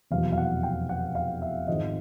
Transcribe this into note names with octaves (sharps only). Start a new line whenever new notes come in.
F1 E2 B2 F#3 F5
F5
F#5
G5
F#5
F5
E5
G#1 G#2 F3 D#5